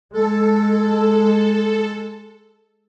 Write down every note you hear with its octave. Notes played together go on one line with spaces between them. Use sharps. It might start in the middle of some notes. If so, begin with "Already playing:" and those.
G#3 A4